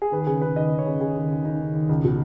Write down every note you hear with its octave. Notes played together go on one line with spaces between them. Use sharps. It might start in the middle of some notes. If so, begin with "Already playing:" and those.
G#4
D#2 B4
C#3 G#4
C#3 B4
D#2 D#5
D#2
C#5
C#3
C#3 G#4
D#2
D#2
C#3 D#4
C#3
D#2
C#2
B2